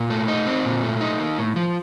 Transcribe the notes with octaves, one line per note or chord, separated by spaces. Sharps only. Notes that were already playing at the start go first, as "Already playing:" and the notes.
Already playing: A#2
A3
D#4
C4
A#2
A3
D#4
A#3
A2
F3